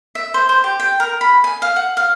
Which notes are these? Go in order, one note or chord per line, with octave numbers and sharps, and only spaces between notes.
E5
C5
C5
G4
G5
A#4
B5
G#5
F5
F#5
F5